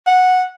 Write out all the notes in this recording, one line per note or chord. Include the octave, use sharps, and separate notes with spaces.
F#5